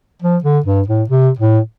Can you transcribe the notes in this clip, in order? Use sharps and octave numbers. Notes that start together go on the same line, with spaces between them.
F3
D3
G2
A2
C3
A2